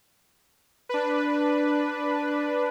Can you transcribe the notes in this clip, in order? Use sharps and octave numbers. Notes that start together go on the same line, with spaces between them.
D4 B4